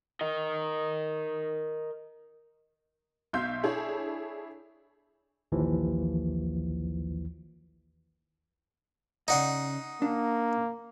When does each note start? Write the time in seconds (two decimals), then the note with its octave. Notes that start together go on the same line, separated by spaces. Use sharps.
0.21 A#4 D#5
3.33 B1 B2 E5 F5 C6 G6
3.63 D4 E4 G#4 A4 C#5
5.52 A#1 D#2 E3 F3
9.28 C#3 D#4 D5 D#5 F#5 C6
10.02 A#3 D4